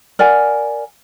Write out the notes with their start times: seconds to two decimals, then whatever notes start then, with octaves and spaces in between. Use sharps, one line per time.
0.19 A#4 D5 F#5 G#5